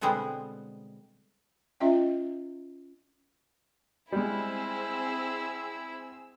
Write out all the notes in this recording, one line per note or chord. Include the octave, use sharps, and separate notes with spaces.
B2 D3 G3 G#3 B3 C4
C#4 F4 D#5 E5 G5
G3 G#3 C4 E4 G#4 E6